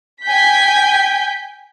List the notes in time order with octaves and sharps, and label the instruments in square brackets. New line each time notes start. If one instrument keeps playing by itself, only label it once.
[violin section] G5 G#5 G6 B6